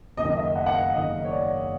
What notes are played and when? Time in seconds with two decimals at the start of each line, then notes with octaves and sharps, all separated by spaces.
0.17 F#1 F#2 D#3 D#5
0.30 D#5
0.37 E5
0.56 F#5
0.66 F#5
0.75 F5
0.93 F#1 F#2 D#3 D#5
1.25 C#5
1.31 D5